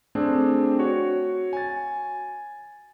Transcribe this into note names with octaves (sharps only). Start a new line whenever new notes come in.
A3 C4 D4 G#4
F#4 C#5
G#5 A6